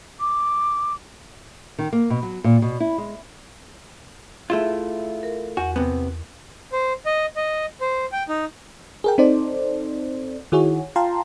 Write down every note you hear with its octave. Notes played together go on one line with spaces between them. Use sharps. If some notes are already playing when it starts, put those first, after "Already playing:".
D6
D#3
A#3
B2
F#3
A#2
B2
E4
G#3
A3 E4 F4 G#4
A#4
E2 F#4
C3 B3
C5
D#5
D#5
C5
G5
D#4
G#4 A#4 G5
C4 D#4 A4 C5 D5
D#3 E4 F#4 G#4 C#5
F4 F5 G5 A5 A#5 C6